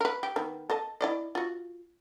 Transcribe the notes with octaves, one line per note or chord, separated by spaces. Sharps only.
A#4 B4
G4
D#3 B3
A4 D#5 A5
E4 D5 D#5
F4 F#4